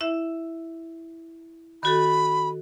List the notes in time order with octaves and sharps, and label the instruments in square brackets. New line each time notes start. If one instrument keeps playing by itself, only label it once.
[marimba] E4 E5
[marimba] D#3 F#4 A4 [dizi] B5